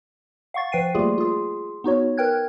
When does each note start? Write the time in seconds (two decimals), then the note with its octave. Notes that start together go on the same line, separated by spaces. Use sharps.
0.54 F5 F#5 C#6 A6
0.72 F3 B4 G5 C7 D#7
0.95 G3 A3 A#3 F4 G4 G#4
1.18 F4 G#4
1.84 B3 D#4 F#4 C#5
2.17 A#4 B4 G5 F#6 G#6